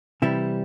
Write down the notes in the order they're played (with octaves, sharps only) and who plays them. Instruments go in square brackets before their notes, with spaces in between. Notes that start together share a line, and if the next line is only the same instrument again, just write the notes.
[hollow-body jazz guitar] C3 E3 G3 E4